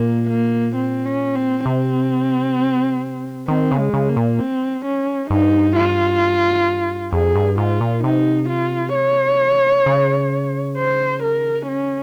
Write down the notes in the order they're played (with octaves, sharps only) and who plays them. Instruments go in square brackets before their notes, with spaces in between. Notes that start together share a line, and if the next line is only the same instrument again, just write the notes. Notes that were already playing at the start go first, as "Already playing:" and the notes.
Already playing: [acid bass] A#2 [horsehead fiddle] A#3
[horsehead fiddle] A#3
C4
C#4
C4
[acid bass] C3 [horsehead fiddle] C4
[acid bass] D#3 [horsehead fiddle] C4
[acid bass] C#3
[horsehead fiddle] G#3
[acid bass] C#3
[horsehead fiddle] A#3
[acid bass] A#2
[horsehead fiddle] C4
C#4
[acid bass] G2 [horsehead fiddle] D#4
[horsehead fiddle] F4
[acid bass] F2 [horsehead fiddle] G#4
[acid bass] G2
[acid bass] G#2 [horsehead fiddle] F4
[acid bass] A#2
[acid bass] C3 [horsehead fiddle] D#4
[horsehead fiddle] F4
C#5
[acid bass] C#3
[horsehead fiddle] C5
A#4
C#4